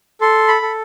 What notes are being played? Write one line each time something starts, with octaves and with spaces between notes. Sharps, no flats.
A4 C6
B5
A4